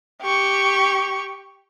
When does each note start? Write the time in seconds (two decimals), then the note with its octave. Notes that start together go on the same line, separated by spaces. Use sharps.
0.22 G4 C#6